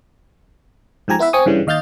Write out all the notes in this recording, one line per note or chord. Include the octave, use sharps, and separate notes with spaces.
G#2 F3 G4 G#5 A#5
B3 E4 B4 E5
C4 G#5 C#6 D#6
G2 C#3 E3 G3
D#2 D#5 F5 F6 G6 A6